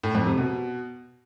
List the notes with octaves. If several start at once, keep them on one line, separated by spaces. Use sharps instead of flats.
A2
F2
C3
B2